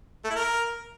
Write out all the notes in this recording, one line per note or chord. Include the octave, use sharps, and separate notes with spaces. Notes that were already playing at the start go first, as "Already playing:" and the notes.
A3
E4
A#4